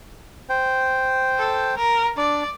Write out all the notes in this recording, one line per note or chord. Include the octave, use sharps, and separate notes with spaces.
C5 G5
A4
A#4
D4 D5